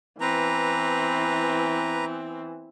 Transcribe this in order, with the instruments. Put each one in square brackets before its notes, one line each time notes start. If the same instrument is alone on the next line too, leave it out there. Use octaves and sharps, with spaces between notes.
[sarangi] E3 [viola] B3 C4 [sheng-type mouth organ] B4 A#5